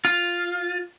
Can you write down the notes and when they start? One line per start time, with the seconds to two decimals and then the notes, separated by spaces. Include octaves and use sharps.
0.05 F4